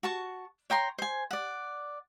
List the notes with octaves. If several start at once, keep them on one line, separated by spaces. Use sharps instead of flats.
F#4 A5 C#6
C#5 G5 A#5 C6
C5 G#5
D5 F#5